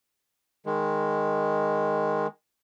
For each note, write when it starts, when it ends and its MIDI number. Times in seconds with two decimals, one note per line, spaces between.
0.66 2.27 51
0.66 2.27 56